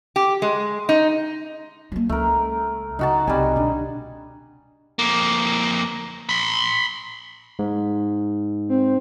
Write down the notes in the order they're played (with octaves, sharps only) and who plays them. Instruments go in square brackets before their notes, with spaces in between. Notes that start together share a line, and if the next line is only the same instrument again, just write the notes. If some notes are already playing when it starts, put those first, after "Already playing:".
[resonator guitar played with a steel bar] G4
G#3
D#4
[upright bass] F#3 A#3
[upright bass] C#2 [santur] A3 A#4
[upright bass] C#3 [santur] D#4 F#4 A5
[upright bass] C2 [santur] G3 G#5
[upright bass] B2 D3
[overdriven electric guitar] F2 A#3
B5 C6
[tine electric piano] G#2
[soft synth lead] C4